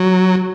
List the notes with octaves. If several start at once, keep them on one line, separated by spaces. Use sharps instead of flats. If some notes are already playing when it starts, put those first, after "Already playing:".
Already playing: F#3